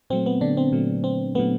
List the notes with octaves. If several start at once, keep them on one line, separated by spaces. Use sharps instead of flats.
A#2 F#3 A3 C4
B3
D3 D4
C4
A#2 F#3 A3
C4
A#2 F#3 A3 B3